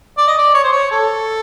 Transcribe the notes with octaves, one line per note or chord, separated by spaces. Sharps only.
D5
D#5
D5
C#5
C5
C#5
A4